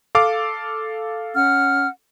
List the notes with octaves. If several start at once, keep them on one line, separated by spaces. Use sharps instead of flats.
A4 F5 D6
C#4 F#5 F6